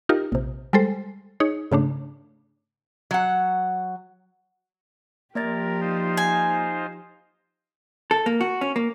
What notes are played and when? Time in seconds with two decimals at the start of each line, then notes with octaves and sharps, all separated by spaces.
0.09 D#4 F4 G4 A#4
0.32 A#1 C3
0.73 G3 G#3 A4 C5
1.40 D#4 G#4 C#5
1.72 G#2 C#3 A3 D4
3.11 F#3 F#5
5.35 F3 A#3 G4 A#4 D5 A6
5.81 D#4 F4 C5
6.17 G#5
8.11 A4
8.26 A#3
8.41 F#4
8.61 C#4
8.76 A#3